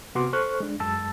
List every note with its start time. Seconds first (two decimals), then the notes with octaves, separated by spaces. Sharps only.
0.15 C3 B3 F#4 C6 D6
0.33 A4 C5 C#6 F6 F#6
0.60 G#3 D4
0.80 F#2 G#3 A5 E6 A6